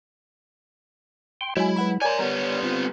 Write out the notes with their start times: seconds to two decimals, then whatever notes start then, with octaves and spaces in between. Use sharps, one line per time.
1.41 G5 C6
1.57 F#3 G#3 E4 F#4 G#5
1.76 B4 F#5 B5
2.02 A#4 C#5 D5 G#5 A#5
2.19 G3 B3
2.63 C4 F4